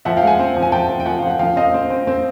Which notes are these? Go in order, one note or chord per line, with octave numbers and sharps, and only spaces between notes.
F3 E5 F#5
F5 G5
G#3
F#5 G#5
C4
F3
G#5
F3 G5 A5
C4
G5
F3 F#5 G#5
F3 F5
F#5
F3 F5 G5
C4 D#5 F5
C4
C4
C4